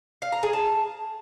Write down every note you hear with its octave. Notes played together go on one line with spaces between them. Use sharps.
F5
A#5
G#4
A5